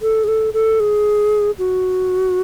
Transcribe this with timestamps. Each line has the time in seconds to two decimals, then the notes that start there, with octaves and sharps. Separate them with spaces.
0.02 A4
0.24 G#4
0.28 A4
0.54 A4
0.80 G#4
1.59 F#4